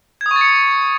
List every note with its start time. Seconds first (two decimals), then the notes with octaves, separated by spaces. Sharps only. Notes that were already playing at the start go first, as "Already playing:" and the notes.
0.21 G#6
0.26 D#6
0.31 C#6
0.36 A6
0.41 C#7